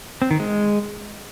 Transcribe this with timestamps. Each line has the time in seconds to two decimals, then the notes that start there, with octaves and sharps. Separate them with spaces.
0.22 C4
0.31 D#3
0.40 G#3